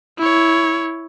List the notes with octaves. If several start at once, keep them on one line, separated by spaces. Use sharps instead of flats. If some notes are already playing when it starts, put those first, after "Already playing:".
E4 C#5